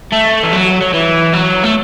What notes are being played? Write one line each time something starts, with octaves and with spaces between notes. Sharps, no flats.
A3
E3
F#3
F#3
E3
F#3
A3